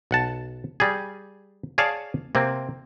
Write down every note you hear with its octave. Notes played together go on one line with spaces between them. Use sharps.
B1 F#5 A5
G3 G#4
G#4 C#5 D5 F5 A5
C3 A#3 C4